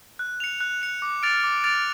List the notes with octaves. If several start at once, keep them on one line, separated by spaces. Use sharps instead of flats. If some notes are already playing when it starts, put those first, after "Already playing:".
F#6
C#7 F7
F#6
C#7 F7
D6
F6 A6 D7 F7
D6
F6 A6 D7 F7